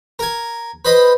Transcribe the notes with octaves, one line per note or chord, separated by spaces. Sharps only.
A#4 G#5
B4 C5 D#5 B5 D#6